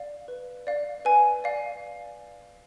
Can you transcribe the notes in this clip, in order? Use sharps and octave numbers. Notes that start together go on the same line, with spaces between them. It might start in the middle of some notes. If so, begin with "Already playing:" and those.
Already playing: D5 F5
B4
D5 F5
B4 G#5
D5 F5